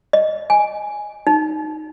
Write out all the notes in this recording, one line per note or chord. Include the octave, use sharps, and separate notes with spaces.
D#5
G#5
D#4